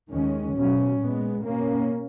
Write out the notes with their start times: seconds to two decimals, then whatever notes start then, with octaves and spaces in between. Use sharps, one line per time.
0.10 D#2 D#3 G#3 C#4
0.54 B2 F#3 C#4
0.99 A#2 G#3 B3
1.43 B2 A#3 C#4